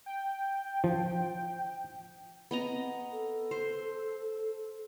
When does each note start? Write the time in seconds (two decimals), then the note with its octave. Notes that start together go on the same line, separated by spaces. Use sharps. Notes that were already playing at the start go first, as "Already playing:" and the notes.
0.06 G5
0.84 F3
2.51 B3 C4 D#5 A#5
3.12 A4
3.51 C5
4.57 A4